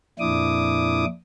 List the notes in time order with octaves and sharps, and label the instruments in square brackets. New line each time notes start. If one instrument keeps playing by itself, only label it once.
[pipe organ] F2 A#2 D4 E4 D6 D#6